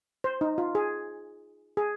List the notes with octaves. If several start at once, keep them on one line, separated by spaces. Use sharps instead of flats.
C5
D#4
F4
G#4
G#4